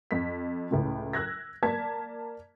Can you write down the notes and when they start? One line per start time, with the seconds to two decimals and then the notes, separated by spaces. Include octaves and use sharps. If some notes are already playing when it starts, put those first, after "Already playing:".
0.11 F2 B6
0.71 C#2 A2 C#3
1.13 E6 F#6 G#6 A#6
1.63 A#3 D5 A5 G#6 B6